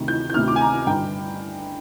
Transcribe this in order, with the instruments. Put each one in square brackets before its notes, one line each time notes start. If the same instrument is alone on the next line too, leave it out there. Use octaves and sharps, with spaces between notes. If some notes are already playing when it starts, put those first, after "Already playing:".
Already playing: [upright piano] D2 C3 D#3
G6
G6
D2 C3 D#3 F6
D6
G#5
A#5
G2 D3 G5